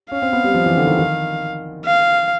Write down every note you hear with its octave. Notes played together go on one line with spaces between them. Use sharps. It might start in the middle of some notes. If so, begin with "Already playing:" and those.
C#4 F5
C4
B3
G3
F3
E3
D3
D#3
D#3
F5